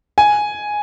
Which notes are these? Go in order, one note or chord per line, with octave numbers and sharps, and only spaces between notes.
G#5